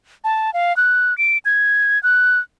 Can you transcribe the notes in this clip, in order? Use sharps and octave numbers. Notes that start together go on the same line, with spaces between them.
A5
F5
F#6
D7
G#6
F#6